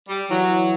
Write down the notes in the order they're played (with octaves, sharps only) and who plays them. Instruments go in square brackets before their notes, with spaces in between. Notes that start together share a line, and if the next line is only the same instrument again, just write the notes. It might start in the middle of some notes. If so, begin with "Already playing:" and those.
[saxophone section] G3
[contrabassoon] E3 [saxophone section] F#3